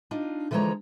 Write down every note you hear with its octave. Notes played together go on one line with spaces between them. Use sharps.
D4 D#4 F4
D3 E3 F3 G#3 C#5 A#5